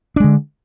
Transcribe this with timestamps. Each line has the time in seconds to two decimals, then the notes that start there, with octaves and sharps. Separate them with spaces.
0.16 D4
0.20 G#3
0.24 D3